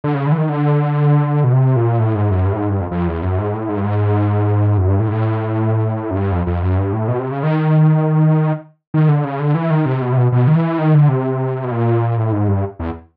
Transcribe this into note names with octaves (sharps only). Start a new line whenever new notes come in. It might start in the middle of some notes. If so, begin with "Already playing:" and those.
D3
C#3
D3
E3
D#3
D3
B2
C3
A#2
A2
G#2
F#2
G2
A2
G#2
G2
F2
F2
E2
F#2
G#2
A2
G#2
G2
G#2
F#2
G2
A2
G#2
A2
F#2
G2
F2
F2
F#2
G2
A2
B2
C3
C#3
D#3
D#3
D3
C#3
D3
E3
D#3
C3
B2
C3
B2
B2
D#3
E3
D#3
D3
C3
B2
A#2
A2
G#2
G2
E2